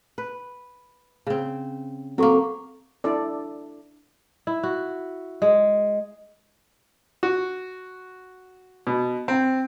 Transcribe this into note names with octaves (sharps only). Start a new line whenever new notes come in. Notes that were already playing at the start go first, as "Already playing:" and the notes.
B4
C#3 C4
F#3 A#3 C4 A4 C#6
D4 E4 A4 D5
E4
F#4
G#3
F#4
B2
C4